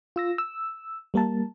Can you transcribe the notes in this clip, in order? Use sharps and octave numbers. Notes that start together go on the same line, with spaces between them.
F4 E6 A#6
E6
G3 A#3 A#4 A5